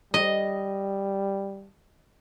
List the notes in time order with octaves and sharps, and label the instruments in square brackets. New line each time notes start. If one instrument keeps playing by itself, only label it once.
[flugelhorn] G3 [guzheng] D#5